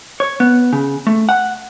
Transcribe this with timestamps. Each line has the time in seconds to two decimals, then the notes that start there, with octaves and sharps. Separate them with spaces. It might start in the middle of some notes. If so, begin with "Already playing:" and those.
0.20 C#5
0.40 B3
0.73 C#3
1.07 A3
1.29 F#5